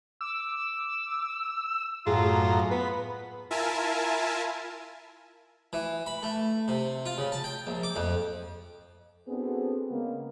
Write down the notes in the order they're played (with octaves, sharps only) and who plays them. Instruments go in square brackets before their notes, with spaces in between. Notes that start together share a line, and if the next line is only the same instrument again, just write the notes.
[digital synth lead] D6 [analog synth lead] E6
[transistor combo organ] F#2 A2 A#5 [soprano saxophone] F4 [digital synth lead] G#4
[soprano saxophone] B3 [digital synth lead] B4 [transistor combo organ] B5
[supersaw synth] E4 F4 A#4 E5 G#5 A5
[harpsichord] E3
B5
A3
C3
F4
C#3
A5
G5
A#1
D6
F2
[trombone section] B3 C4 D4 F#4 G#4 A4
C#3 G#3 A#3 B3